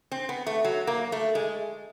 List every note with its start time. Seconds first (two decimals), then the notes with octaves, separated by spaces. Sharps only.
0.12 C4
0.29 B3
0.47 A3
0.65 F#3
0.87 A#3
1.12 A3
1.35 G#3